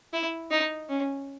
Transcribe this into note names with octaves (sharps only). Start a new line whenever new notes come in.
E4
D#4
C#4